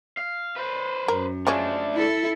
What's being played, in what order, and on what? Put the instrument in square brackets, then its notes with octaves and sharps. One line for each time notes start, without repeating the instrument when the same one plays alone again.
[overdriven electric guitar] F5
B4 C5
[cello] F#2 [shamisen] A#4
[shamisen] F3 G#3 C#4 [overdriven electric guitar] A3 D4
[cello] E4 A4